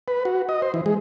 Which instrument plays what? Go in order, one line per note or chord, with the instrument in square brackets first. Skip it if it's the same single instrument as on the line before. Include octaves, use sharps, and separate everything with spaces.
[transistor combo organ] B4
F#4
D#5
C5
E3
G#3